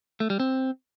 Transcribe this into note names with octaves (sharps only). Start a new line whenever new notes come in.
A3
G3
C4